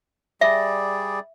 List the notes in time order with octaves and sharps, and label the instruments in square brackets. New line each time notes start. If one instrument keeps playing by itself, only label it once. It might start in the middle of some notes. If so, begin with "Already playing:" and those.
[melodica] G3 G#4 D5 [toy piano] E5